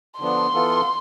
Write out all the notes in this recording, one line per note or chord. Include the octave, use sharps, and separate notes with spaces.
D3 F3 B3 D4 C6
E3 B3 F4 A4